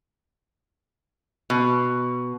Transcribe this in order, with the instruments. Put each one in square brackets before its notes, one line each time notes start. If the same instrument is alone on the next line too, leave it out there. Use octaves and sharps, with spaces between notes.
[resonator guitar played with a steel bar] B2